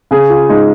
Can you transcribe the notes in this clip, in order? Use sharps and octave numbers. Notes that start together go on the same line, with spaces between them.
C#3 G#4
F4
G#3 D#4